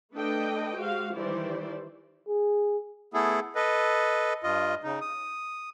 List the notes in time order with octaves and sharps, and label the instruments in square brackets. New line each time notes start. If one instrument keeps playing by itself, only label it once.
[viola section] A3 D4 A4 B4 D#5 G5
G#3 F#4 G4 C5 F5
D#3 E3 G3 E4 C5 D5
[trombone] G#4
[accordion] A3 B3 E4 G#4 A4
A4 B4 D#5
G2 F4 D#5
C#3 D#4
D#6